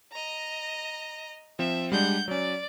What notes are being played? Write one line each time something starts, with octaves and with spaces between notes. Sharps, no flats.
D#5 A#5
F3 C4 E5 E7
G3 G#3 D4 F#5 G6
F#3 C#4 D5